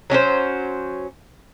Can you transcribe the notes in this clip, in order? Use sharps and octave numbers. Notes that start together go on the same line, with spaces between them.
F#3 C#4 D#4 C5